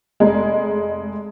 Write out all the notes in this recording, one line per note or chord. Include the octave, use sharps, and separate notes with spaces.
F1 G#3